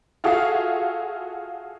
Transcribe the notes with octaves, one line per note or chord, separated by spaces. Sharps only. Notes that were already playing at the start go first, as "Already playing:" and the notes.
F4 F#4 G#4 A4 E5 F5